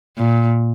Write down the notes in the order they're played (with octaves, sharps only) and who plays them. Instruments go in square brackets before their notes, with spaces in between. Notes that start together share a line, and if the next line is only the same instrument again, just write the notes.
[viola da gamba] A#2